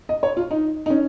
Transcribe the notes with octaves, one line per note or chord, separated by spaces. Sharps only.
D#5
C#5
F4
D#4
D#4
C#4